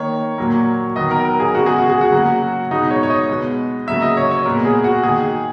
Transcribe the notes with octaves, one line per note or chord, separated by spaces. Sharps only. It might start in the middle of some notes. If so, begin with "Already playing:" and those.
Already playing: D#3 A#3 C#5
A#2 F#3 A#3
D#3 F#3 B3 D#5
A#4
A#4
G#4
C#3 G#3 B3 F#4
G#4
F#4
G#4
F#4
C#3 F#3 A#3
B2 G#3 B3 D#4
C#5
C#5
D#5
B2 G#3 B3
C#3 F#3 A#3 E5
D#5
C#5
C#5
A#2 G#3 B3 A#4
G#4
F#4
D#3 A#3 G#4